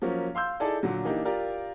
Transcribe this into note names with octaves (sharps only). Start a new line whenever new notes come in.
F3 F#3 A#3 C#4
F5 C6 E6 G6
D#4 E4 G#4 A4 D5 A5
A#2 D3 F#3
E3 A#3 D4 D#4 G4
F4 G4 A#4 D5